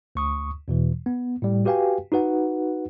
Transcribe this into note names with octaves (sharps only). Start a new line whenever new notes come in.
D2 C#6 D#6
E2 B2 E3
B3
A2 G3
F#4 G4 B4 F5 G5 G#5
D#4 F#4 B4 F#5